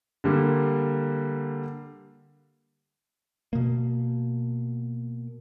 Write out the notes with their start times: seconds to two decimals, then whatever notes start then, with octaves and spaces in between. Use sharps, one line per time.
0.24 D3 G3 A#3
3.53 B2 A#3